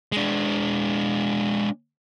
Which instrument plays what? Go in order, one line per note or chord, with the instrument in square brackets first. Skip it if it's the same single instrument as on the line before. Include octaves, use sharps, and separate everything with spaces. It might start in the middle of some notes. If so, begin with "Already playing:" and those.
[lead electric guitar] G#3 D4